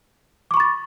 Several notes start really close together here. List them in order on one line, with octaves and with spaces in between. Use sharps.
D6 C#6 B5 A6